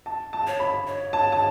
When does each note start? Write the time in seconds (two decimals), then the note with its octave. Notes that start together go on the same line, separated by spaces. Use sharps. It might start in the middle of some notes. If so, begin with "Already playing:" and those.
0.06 A5
0.33 A5
0.47 C#5
0.60 B5
0.87 C#5
1.13 A5
1.32 A5